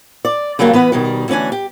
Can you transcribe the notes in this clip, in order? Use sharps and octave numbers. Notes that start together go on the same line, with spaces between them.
D5
C#3 F#3 G3 A#3 D4
E3 B3 B4 F#5
B2 D#3 G3
D2 E3 C#4 D4 G#5
G4